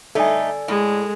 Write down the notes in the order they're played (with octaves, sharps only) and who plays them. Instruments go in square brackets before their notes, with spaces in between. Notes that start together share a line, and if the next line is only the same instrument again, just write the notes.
[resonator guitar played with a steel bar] A3 D#4 [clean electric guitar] A4 D5 G#5
[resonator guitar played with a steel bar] A2 [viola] G#3